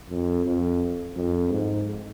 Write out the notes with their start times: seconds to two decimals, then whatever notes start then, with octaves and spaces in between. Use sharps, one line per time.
0.10 F2
0.45 F2
1.16 F2
1.51 G#2